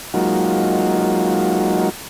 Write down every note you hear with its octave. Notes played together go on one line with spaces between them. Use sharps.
F#3 G#3 A#3 D#4 F4 F#4